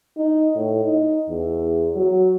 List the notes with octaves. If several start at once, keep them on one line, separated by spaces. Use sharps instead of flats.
D#4
A2
D#4
E2
F#3